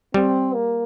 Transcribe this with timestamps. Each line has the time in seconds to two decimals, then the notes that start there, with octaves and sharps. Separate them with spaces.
0.14 G3 C4
0.54 A#3